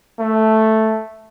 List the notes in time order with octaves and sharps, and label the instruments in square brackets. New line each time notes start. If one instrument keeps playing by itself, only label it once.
[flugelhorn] A3